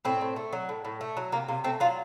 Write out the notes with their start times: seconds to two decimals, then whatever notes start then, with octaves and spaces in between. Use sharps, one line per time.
0.05 A2 C4
0.21 A2
0.36 A3
0.53 F#3
0.69 A2
0.85 A2
1.01 A3
1.17 F#3
1.32 C3 A#3
1.48 C3 A#3
1.64 A3 C4
1.80 F#3 F4